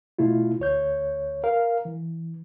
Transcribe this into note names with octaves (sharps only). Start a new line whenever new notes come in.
B2 A3 E4 F4
D2 C#5 G6
A#4 F5
E3